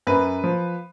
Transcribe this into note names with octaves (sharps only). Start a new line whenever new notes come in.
F#2 B4
F3